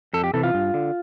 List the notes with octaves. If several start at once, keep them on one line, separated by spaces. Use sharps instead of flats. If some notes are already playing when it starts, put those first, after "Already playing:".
F2 A4
G4
C3 E3 A4
F4
G2
D3